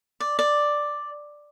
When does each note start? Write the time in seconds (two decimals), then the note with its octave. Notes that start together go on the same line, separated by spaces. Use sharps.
0.20 D5
0.39 D5